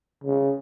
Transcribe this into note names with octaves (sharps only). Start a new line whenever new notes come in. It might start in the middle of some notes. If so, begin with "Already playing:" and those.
C#3